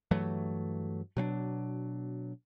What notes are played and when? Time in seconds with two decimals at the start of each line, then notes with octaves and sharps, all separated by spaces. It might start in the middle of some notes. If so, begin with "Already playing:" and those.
0.11 G2 E3 F#3 A3
1.17 B2 F#3 C4 D4